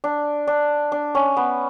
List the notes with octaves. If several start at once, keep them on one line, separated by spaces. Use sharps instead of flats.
D4
D4
D4
C#4
B3